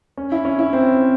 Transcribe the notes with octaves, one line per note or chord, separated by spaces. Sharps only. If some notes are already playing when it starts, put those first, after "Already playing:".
C#4
E4
C#4
E4
C4